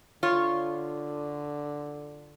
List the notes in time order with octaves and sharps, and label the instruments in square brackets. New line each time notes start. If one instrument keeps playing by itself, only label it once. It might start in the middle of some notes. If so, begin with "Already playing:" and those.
[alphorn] D3 [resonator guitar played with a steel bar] F4 C#5